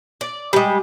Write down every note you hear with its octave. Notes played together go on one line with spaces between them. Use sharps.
D5
G3 G#3